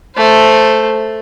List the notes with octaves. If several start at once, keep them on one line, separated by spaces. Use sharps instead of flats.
A3 C5